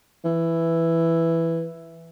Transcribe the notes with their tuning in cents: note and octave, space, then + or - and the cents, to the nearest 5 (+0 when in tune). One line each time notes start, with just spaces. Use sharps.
E3 +5